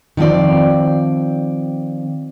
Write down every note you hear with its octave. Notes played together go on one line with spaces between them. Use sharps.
D#3 F3 A3 C4 D5